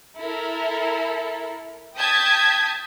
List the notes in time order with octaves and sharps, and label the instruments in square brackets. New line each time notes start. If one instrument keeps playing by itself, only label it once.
[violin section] E4 A4 A#4
G5 A5 D#6 G6 G#6 B6